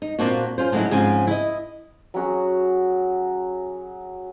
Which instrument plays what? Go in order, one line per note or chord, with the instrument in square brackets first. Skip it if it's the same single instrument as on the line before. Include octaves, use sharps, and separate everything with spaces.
[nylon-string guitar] D#4
A#2 A#3 C4 D4 F4 F#4
C#4 F4 C5
A2 C#3 F#3 C#4 D#4 E4
G#2 C#3 F3 C4 G#5
E4 D#5
[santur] F#3 C#4 F#4 G#4